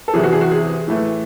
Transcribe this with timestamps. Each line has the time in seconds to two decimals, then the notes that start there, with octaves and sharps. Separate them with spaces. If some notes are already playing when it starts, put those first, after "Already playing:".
0.08 A4
0.13 E2 C3 E3 G#4
0.24 F#4
0.32 G#4
0.41 F#4
0.51 G#4
0.88 A2 E3 A3